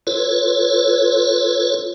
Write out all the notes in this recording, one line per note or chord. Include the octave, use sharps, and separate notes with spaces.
F4 A4 B4 C#5